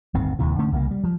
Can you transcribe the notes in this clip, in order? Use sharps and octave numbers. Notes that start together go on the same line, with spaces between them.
D1 G1 D#3 C4
D1 D#2 C3 E3
D3 A3 C#4
C2 C#3 A3 A#3
G3
F3